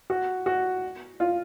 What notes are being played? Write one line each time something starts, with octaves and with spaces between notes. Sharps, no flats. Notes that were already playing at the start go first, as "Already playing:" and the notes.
F#4
F#4
F4